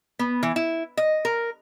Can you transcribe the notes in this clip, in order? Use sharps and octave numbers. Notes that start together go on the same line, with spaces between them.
B3
E3
E4
D#5
A#4